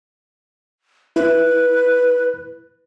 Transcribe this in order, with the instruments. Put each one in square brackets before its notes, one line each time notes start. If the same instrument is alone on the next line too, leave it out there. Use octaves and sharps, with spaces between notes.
[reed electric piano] E4 [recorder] B4